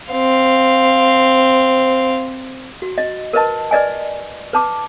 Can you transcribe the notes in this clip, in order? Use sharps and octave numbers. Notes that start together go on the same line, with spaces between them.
C4 F5
F#4
D#5
A#4 B4 D#5 A5
B4 D5 D#5 G#5
B4 A5 D6